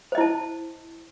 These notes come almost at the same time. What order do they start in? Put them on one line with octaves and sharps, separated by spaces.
C5 D#5 E4 A5